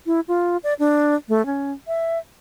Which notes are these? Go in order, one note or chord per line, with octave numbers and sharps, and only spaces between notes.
E4
F4
D5
D4
A3
C#4
E5